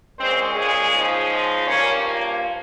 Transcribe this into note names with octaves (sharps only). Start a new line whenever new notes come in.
A#2 G#3 C4 C#4 C5
G#3 G#4
C#3 F3 G#3 D#4
G2 F3 A#3 C#4 C#5